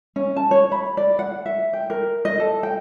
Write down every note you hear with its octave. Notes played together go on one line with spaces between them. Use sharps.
C#4
A5
C#5
B5
D5
F#5
E5
G5
A#4
D#5
A4
G5